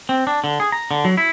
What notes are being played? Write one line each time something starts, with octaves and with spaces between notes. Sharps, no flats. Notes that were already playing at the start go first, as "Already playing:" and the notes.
C4
D4
D3
G#4
A#5
D3
F#3
E4